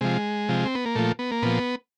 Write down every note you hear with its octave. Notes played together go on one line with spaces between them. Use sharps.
C3 F3 G#3
C3 F3
C4
B3
A#3
A#2 F3 A3
B3
A#3
A#2 F3 B3